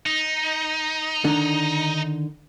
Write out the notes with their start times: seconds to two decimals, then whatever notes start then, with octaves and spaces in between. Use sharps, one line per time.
0.06 D#4
1.24 D3 D#3 D4